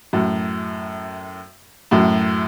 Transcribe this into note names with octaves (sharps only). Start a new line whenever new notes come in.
F#2 A2
F#2 A2